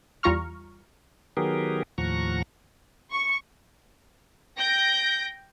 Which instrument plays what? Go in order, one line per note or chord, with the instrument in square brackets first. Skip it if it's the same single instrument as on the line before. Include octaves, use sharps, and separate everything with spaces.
[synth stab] E2 G3 F4 A#5 C#6 F6
[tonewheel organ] D#3 F#3 B3 G4 G#4 A#4
D#2 A2 F3 F#5 A#5 C#6
[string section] C#6
[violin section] G5 G6 A#6 D7